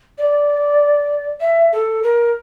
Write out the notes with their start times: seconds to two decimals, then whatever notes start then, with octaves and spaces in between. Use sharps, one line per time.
0.18 D5
1.40 E5
1.72 A4
2.03 A#4